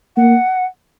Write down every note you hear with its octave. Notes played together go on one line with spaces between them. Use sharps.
A#3 F#5